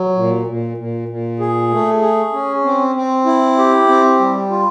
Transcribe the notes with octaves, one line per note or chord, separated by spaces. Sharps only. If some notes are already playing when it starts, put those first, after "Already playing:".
Already playing: F#3
A#2
A#2
A#2
A#2
G#4
A3
G#4
C#4
C4
C4
E4
G4
C4
G3
F4